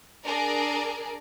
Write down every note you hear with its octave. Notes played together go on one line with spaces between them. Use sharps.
D4 G#4 A#4 D5